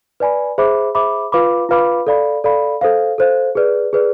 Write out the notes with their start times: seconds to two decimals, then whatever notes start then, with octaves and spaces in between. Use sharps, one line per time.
0.20 B4 D5 G#5 B5
0.58 G#4 C5 E5 B5 D6
0.95 G#4 C5 E5 B5 D6
1.32 F4 B4 F5 B5 D6
1.69 F4 B4 F5 B5 D6
2.07 A4 D5 F5 B5
2.44 A4 D5 F5 B5
2.81 A4 C5 F5
3.18 A4 C5 F5
3.55 G#4 B4 D5
3.93 G#4 B4 D5